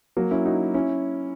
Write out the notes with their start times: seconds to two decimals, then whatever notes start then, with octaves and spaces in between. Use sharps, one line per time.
0.17 F#3 A#3
0.31 C#4 E4
0.45 D#4 F#4
0.74 C#4 E4